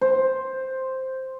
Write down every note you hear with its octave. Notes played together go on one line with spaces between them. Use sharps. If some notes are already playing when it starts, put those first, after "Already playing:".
C5